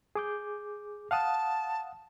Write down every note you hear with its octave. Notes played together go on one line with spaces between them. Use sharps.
G#4 D6 G6
F5 F#5 A5 D#6